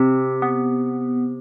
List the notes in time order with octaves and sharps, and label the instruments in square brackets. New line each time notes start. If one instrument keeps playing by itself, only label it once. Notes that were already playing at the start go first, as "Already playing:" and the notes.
Already playing: [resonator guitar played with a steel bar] C3 [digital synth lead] C4
[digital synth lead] B3